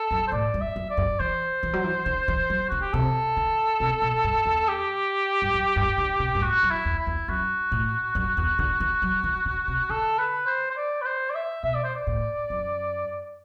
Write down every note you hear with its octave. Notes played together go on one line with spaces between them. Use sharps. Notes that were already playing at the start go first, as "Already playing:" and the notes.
Already playing: A4
F#2
C5
A2 D5
G2
E5
F#2
D5
F#2
E3 C5
E3
F#3
E3
D3
E3
F#3
D3 F#4
G4
C3 A4
D3
C3
B2
G2
E2
G4
G2
F#2
G2
D3
C3
G2
A2 F#4
F#2
E4
E2
E4
E2
F#2 F#4
A2
F#2
E2
D3
E3
F#3
E3
D3
C3
D3 A4
B4
C5
C5
D5
B4
C5
D5
E5
B2 E5
D5
C5
D5
A2
F#2